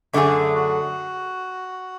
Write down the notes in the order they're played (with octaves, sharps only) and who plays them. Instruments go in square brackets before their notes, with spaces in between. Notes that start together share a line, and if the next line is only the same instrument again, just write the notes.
[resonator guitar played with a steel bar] F#2 D3 A3 D4 G#4
[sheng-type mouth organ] F#4